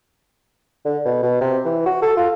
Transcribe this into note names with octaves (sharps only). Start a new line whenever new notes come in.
D3
B2
B2
C3
E3
F#4
A4
F4